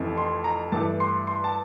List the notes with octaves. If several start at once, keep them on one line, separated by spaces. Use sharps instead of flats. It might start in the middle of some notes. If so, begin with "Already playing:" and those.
Already playing: F1 F2 E3
C6
A#5
G2 E3 A3 A5
C6
C6
A5